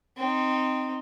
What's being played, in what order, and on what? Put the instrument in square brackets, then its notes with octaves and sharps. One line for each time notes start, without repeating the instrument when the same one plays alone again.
[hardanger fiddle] C4 D#4